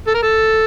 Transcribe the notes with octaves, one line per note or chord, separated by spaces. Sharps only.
A4
A#4
A4